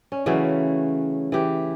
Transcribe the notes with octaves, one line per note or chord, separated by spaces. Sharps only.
C#4
C#3 E3 F#3 A3
E3 G4